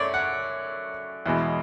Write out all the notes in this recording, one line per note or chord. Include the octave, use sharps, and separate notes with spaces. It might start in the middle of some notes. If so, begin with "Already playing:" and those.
Already playing: F#2 A3 C#5 D5
F#5
E2 B2 G#3